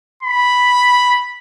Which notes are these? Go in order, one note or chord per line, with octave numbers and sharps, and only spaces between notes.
B5